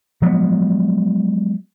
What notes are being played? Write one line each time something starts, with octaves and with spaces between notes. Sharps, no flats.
F3 F#3 G#3 B3